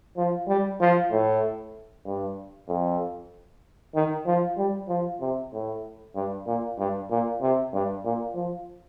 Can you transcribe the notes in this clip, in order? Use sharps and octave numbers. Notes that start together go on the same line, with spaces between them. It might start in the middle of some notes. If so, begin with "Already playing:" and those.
F3
G3
F3
A2
G2
F2
D#3
F3
G3
F3
C3
A2
G2
A#2
G2
A#2
C3
G2
A#2
F3